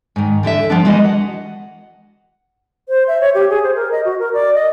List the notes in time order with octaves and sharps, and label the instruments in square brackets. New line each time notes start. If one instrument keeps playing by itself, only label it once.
[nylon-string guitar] G#2 D#3
D3 E3 A4 E5
F3 B3 D4
E3 G#3 F#4 A#4 D#5
F#5
[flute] C5
E5
C#5
G4
G#4
C5
A#4
D#5
F#4
A#4
D5
D#5